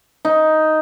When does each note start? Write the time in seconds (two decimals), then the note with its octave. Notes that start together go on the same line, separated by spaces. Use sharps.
0.25 D#4